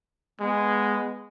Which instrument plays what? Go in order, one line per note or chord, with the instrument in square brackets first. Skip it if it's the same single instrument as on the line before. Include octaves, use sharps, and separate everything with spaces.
[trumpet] G#3 [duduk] B3